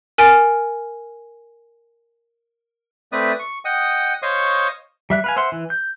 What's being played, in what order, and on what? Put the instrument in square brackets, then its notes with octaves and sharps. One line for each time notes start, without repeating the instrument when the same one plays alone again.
[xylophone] A#4 G#5 F6 A6 D7
[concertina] A3 C4 B4 D5 E5 D#6
C#6
D#5 F#5 G5 D#6
C5 C#5 D#5 F5 C#6 D#6
[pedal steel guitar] G3 E5 F#6
B4 F5 G#5
C5 E5 F#5 C6
E3
G6